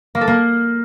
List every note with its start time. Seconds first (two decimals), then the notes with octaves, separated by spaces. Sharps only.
0.15 A#3
0.21 A4
0.27 A#3